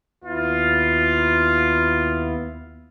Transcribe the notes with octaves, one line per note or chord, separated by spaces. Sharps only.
D#2 B3 E4 F4